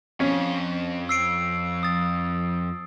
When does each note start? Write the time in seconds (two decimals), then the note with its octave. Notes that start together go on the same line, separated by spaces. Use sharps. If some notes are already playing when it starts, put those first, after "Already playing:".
0.20 F2 C#4
1.09 E6 C7 D7
1.83 D#6 A6